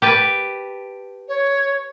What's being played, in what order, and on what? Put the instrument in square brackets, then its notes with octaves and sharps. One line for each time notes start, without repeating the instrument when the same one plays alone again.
[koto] G4 B4 A5
[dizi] C#5